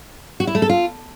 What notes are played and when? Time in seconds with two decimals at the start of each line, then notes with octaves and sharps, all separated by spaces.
0.40 F#4
0.47 E4
0.55 A3
0.62 A4
0.69 F4